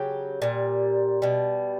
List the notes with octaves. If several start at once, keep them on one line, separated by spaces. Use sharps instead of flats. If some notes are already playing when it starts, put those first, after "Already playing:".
Already playing: C#3 F#3 G4
A#2 G3
B2 G3